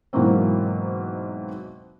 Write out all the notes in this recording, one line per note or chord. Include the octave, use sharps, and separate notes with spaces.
G#2 B2 E3 F#3 A#3 C4